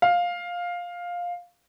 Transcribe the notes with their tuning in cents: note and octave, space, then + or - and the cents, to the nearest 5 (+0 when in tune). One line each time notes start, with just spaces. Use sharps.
F5 +10